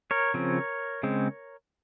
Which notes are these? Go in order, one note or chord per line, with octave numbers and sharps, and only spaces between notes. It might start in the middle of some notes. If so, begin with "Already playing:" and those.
A#4 C#5
C#3 F3 C4
C#3 G#3 C4